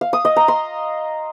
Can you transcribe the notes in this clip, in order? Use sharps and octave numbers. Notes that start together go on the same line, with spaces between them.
F5
D#6
D#5
A#5
C6